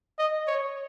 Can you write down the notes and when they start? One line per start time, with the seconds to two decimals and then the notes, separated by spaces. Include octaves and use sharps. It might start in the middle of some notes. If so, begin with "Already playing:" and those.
0.19 D#5
0.47 C#5